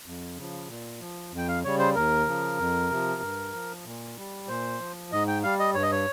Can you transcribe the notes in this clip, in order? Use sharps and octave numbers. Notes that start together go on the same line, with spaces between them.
F2
C#3 F3
A#2
F3
F2
G5
F5
C#3 G3 C#5
C5
D#2 A#4
C#3 F3
F2
C3 F3
G2
F3
A#2
G3
A#2 C5
F3
G#2 D#5
G5
G3 F5
D#5
G2 C#5
D#5
C#5